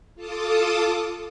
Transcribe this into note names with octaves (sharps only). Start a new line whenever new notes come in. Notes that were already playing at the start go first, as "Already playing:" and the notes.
F4 A4 A5 D6 D#6